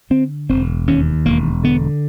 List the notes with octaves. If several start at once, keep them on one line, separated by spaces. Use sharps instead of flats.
D3 C4
E1 C4
D#2 C#4
E1 A#3
D3 B3